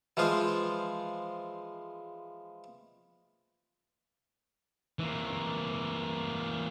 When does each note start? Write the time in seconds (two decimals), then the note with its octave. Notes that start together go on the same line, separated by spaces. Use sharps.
0.17 E3 F3 G#3 F4 C5
4.99 E3 A#3